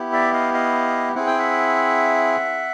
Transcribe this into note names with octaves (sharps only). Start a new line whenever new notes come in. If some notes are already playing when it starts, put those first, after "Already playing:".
Already playing: B3 E4 G4
D5 E5
D#5 F5
D#5 F5
C4 E4 G#4 F#5
G5
E5 F#5